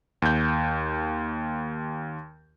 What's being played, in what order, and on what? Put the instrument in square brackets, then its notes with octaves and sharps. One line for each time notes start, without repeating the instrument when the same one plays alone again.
[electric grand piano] D#2 G6